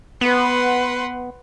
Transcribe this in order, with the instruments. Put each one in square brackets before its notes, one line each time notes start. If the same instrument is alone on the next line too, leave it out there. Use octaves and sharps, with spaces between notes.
[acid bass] B3 [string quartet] B4 F#5 C6